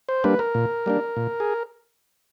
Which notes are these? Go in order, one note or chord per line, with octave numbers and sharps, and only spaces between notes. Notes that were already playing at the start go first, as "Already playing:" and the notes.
C5
G3 A#3 D4 B4
A#4
A#2
G3 A#3 D4
A#2
G#4